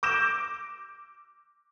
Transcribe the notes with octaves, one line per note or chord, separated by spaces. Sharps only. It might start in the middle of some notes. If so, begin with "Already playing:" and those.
D6 E6 G6 A#6 D7 E7